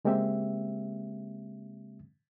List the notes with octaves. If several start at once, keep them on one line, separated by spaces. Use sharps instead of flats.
C#3 G#3 A#3 C4 G4 E5